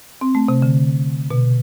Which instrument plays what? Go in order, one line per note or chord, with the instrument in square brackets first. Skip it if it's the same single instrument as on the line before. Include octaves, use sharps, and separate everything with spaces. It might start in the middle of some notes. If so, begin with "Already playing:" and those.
[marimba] C4
A3
C3
D3
B2